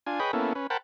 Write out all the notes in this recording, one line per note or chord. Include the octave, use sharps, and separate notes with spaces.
D4 F4 G#5
G#4 B4 C#5 D#5 G5 B5
A#3 B3 C#4 E4 A4
C#4 B4
A#4 C5 F#5 G5 A5 B5